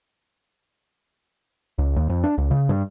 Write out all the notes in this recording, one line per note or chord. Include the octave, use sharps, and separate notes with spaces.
C#2
D#2
F2
D4
C#2
C#3
G2